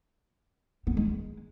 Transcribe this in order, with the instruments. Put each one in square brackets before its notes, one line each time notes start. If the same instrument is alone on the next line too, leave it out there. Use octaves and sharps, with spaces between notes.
[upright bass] B3
G#3
G#3